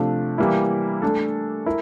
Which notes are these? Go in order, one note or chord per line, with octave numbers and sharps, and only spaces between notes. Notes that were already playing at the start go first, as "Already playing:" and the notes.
Already playing: C3 F3 A3 D4
E3 G3 A#3 E4
A3 D4 A4
E4 A#4